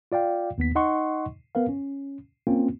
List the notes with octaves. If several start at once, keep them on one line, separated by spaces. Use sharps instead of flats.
F4 D5 F5 G5
D#2 B3 B6
D#4 D#5 F#5 C6 C#6
B3 A#4 B4 F5
C#4
A#3 C4 C#4 F4